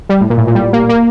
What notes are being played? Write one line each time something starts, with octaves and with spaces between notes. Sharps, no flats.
G3
A2
A#2
A2
A#2
G3
A#3
A#3